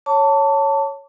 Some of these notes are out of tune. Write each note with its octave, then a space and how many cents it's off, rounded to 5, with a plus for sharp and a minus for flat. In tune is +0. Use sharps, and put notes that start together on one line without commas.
C#5 +0 A5 +15 D6 -45